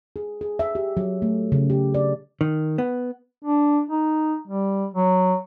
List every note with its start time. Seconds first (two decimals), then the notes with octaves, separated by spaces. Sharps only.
0.16 G#4
0.41 G#4
0.59 E5
0.75 G4
0.97 F#3
1.22 A3
1.52 C#3
1.70 G4
1.94 D5
2.41 D#3
2.78 B3
3.45 D4
3.90 D#4
4.48 G3
4.94 F#3